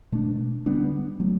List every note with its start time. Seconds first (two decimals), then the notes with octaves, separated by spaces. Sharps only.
0.12 B2 A3 D4
0.66 D3 G3 B3 D4
1.20 F#3 A3